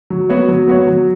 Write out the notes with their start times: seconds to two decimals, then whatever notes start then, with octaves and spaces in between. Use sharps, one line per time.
0.10 F#3
0.29 B3 F#4 C#5
0.49 F#3
0.68 B3 F#4 C#5
0.87 F#3